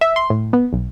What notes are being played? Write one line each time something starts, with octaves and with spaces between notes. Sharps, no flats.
E5
C6
A2
B3
B1